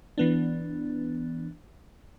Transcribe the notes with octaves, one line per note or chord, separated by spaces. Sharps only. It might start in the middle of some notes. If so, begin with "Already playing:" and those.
E3 B3 D4